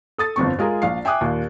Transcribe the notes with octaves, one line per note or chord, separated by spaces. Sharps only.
A4 D#6 A6
G1 F2 C4 C#6
G#3 F4 G#4 A#4
A#1 F5 C7
E5 G5 G#5 D6 D#6 F#6
D#2 A#2